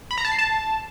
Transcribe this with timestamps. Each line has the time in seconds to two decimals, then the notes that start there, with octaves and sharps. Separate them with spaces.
0.11 B5
0.18 A#5
0.25 A5
0.32 C7
0.39 A5